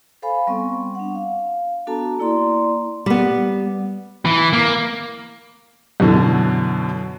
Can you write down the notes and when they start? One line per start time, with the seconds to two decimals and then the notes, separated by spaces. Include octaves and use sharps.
0.22 A4 C5 F5 G#5 B5
0.47 G3 B3 C4 C#6
0.95 D4 F#5
1.15 F5
1.87 B3 D4 F#4 A4 A5 A#5
2.19 A#3 E4 D5 A#5 C6
3.06 G3 B3
4.25 E3
4.53 A#3
6.00 F#2 B2 D3 E3